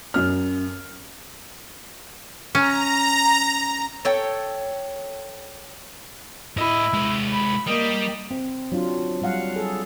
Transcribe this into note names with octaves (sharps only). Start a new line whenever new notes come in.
F#2 F6
C#4 A#5
A4 C#5 G5
A2 E4 D#5
G#3 B4
B5
G3 A#3 D#5
C4
F#3 D4 F4
F#3 G3 F5 F#5
G#4 A4